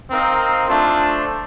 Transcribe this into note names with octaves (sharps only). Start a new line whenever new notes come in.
C4 D#4 A#4 F5
A3 D4 F4 C5